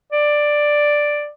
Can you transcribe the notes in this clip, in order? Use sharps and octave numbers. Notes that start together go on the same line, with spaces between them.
D5